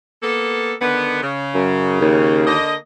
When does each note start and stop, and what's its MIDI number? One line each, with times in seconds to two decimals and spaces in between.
0.23 0.74 58
0.23 0.74 59
0.23 0.74 69
0.80 1.19 50
0.80 1.19 51
0.80 1.19 59
1.22 2.41 49
1.55 1.98 42
2.00 2.55 39
2.47 2.75 50
2.47 2.75 58
2.47 2.75 75